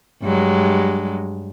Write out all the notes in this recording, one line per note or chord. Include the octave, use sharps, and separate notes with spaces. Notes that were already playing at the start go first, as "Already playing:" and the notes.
G2 F#3 G#3